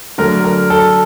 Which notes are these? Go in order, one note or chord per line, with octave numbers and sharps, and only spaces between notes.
D3 F#3 A3 A#4
A#4
A4